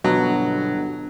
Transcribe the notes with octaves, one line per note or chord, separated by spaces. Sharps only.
G1 B2 F#3